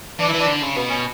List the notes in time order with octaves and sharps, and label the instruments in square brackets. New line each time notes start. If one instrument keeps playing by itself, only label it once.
[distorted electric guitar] E3 [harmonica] D4
[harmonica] E4
[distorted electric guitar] E3
[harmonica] D4
[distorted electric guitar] D3
C#3
[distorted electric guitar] B2 [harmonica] B3
[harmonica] C#4